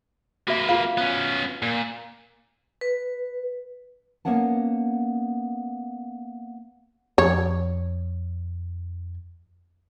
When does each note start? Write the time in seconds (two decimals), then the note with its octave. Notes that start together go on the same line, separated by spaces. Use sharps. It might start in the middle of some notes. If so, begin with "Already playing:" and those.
0.48 A#3 F#4 B4 E5
0.69 F4 F5
0.98 B3 C#4
1.62 A#2
2.81 B4
4.25 A#3 B3 C#4 F#5 A5
7.18 F2 C#5